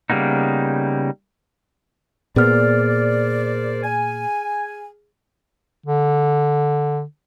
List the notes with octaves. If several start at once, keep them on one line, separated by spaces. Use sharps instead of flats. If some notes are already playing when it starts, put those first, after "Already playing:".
C#3 G3 A#3 B3 D#4
A#2 B3 G#4 A#4 C5 D5 F6
G#5
D3